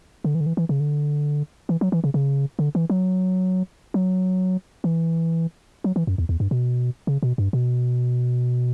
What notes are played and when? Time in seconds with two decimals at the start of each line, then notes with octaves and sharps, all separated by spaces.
0.24 D3
0.35 E3
0.41 D3
0.46 E3
0.57 E3
0.69 C#3
0.80 D3
1.69 E3
1.81 F#3
1.92 E3
2.04 C#3
2.14 C#3
2.59 D3
2.75 E3
2.90 F#3
3.94 F#3
4.84 E3
5.84 F#3
5.96 E3
6.07 F#2
6.18 E2
6.29 E2
6.40 G2
6.51 B2
7.07 C#3
7.23 B2
7.38 G2
7.53 B2